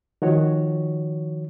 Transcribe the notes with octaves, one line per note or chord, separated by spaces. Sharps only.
D#3 F3 F#4 C#5